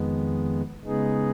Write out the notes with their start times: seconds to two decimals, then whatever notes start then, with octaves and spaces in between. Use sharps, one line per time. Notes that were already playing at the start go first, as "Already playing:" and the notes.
Already playing: F2 D#3 G#3 B3
0.84 C#3 G#3 B3 D#4 G#4